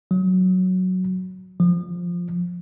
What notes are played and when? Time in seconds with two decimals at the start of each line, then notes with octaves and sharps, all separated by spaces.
0.11 F#3
1.60 F3